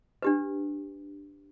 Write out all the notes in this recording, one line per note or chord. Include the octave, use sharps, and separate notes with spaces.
D4 G4 B4